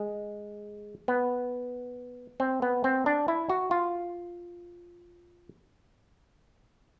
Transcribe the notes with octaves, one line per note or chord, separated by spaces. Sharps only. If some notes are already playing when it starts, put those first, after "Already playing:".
Already playing: G#3
B3
C4
B3
C4
D4
E4
F#4
F4